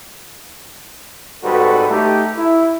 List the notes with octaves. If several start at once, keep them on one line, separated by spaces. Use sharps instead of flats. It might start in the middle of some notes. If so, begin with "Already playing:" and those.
G#1 G#2 G3 F#4 A4 B4
A3 D#4 G4
E4